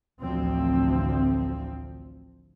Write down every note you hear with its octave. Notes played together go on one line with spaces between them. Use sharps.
A1 D2 F3 C4